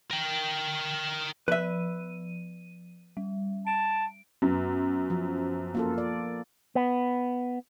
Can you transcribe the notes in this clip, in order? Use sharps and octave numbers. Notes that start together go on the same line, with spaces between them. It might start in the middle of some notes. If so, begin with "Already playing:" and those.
A#4 G5
F3 B4 E5 D#7
G3
A5 D7
F#2 B3
F3
A#3 F4 A4
D5
B3